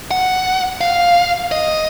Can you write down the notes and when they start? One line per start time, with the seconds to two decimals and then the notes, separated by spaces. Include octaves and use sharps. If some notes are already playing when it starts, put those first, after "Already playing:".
0.11 F#5
0.81 F5
1.52 D#5